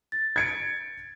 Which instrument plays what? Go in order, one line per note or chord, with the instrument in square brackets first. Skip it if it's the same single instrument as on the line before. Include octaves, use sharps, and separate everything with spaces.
[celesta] A6
[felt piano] G#6 C#7 D7